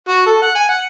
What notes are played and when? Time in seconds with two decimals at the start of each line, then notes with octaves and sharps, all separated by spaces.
0.09 F#4
0.27 A4
0.42 F#5
0.55 G#5
0.69 F#5